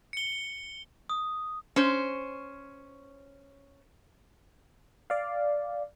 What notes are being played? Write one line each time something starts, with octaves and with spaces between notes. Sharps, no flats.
C#7 G7
D#6
C#4 C5
D5 F5